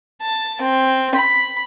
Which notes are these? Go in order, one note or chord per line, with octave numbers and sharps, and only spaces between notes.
A5
C4
B5